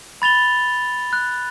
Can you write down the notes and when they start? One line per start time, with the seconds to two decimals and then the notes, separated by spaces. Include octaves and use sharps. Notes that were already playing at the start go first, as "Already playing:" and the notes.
0.22 B5 A6 F7 G7
1.13 F#6